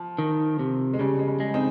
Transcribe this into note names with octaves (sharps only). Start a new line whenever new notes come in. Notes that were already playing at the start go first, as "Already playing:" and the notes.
Already playing: F3
D#3
C3
G#3
C#3 G3
G#3
G3
G#3
C4 D#4